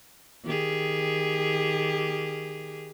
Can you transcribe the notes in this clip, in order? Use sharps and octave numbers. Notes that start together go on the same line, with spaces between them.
D#3 G4 G#4